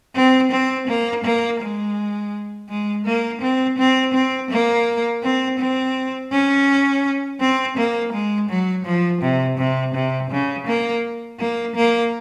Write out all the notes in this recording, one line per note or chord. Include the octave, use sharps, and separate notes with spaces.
C4
C4
A#3
A#3
G#3
G#3
A#3
C4
C4
C4
A#3
C4
C4
C#4
C4
A#3
G#3
F#3
F3
C3
C3
C3
C#3
A#3
A#3
A#3